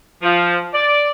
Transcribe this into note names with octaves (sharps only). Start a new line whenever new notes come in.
F3
D5